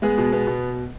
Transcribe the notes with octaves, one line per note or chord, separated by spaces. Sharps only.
G#3 B3 G#4
B2
B3
B2